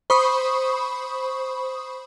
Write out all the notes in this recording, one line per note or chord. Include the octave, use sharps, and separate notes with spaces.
C5 B5 C#6 D#6